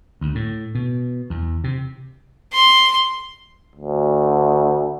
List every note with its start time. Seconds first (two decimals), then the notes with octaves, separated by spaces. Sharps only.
0.21 D2
0.35 A2
0.75 B2
1.30 E2
1.64 C3
2.53 C6
3.75 D2